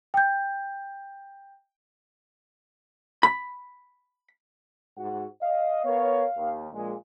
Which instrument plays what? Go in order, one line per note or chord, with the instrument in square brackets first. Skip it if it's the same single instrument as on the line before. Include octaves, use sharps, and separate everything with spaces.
[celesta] G5 G6
[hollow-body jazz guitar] B5
[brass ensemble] G#2 F#4 F#5
[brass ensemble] D#5 [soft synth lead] F5
[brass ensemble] B3 A#4 C#5
D#2
A#1 A#2 G#3